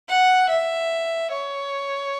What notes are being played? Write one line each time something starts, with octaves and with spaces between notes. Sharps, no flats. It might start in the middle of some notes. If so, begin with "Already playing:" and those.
F#5
E5
C#5